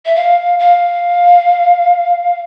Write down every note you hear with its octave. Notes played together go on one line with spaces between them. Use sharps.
E5
F5
F5